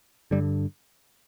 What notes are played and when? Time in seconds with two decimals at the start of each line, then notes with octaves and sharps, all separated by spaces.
0.31 G2 D3 G3